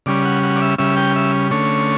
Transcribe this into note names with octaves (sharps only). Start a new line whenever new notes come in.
C#3 G3 C#4 D5
F#5
F#5
D5
E5
C#3 G3 C#4 E5
G5
E5
D3 A3 C#4 C#5